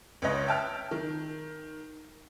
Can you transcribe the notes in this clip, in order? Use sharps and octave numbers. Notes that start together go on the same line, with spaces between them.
C#2 C#4 B4 C#5 D#5
E5 G5 A5 F6
D#3